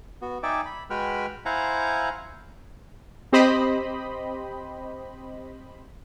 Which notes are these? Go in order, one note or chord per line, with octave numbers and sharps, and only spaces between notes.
B3 F#4
D#4 D5 E5 G5 G#5 D6
B5
G#3 F#4 B4 G5 B5 F6
E4 C5 F5 F#5 G#5 A#5
C4 G4 C5 D#5 B5